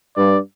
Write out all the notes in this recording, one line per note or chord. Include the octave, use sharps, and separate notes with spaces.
G2 D5